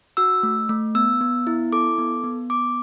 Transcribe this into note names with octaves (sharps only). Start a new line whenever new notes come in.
F#4 E6
A3
A3
B3 E6
B3
E4
A4 D6
B3
B3
B3 D6